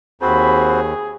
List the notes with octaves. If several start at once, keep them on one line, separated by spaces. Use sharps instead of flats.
D#2 C4 F#4 G#4 C5 B5